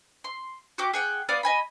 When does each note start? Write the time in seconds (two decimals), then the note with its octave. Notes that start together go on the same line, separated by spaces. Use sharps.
0.24 C6
0.78 F#4 G4 D6
0.94 G#4 F#5 G5
1.29 B3 D5 F5 D#6
1.43 D#5 G#5 B5